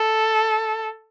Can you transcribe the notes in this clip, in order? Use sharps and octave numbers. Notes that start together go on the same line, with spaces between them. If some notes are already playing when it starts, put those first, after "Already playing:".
Already playing: A4